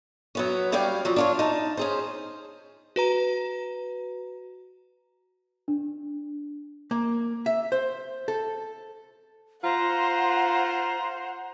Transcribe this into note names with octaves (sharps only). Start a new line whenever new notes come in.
F#3 B3 C#4
G3 C#4 D5 F5 G5
F3 F#3
D4 F4 C#5
D#4 A5
C#4 G#4 C5
F#4 B4 A#5
D4
A#3
E5
C5
A4
F4 C5 F#5 A#5